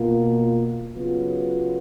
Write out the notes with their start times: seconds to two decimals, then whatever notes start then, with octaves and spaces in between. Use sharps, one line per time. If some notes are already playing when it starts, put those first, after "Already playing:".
Already playing: B2 A#3 F4
0.94 C#3 F#3 B3 F4